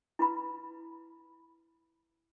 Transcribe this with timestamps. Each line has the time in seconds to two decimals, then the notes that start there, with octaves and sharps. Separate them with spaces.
0.19 E4 B4 B5